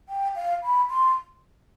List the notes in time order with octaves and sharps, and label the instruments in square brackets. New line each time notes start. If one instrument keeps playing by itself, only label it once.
[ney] G5
F5
B5
C6